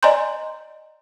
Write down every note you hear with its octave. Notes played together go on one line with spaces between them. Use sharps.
D5 D#5 G#5 A#5 C6 G6